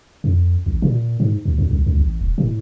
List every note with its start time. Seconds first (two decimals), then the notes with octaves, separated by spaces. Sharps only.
0.24 F2
0.66 A1
0.82 A#2
1.20 G#2
1.45 D2
1.58 D#2
1.71 C2
1.86 C#2
1.99 A1
2.21 D#1
2.38 A2